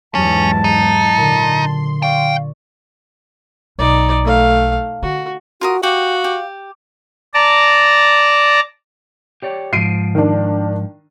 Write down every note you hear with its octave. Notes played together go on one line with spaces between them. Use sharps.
E2 G#2 F#3 C#4 G4 G#4 A5
D#4
A#2 D3 C6
D5 F5 G5 C#6
B1 D#4 D5
A3 F5
D3 F#4
F4 F#4 A#4 D#6
F#4 G4 F5
G4
D5 A5 A#5
G4 C#5 D5
G#2 F3 C7 D7 D#7
D#3 D4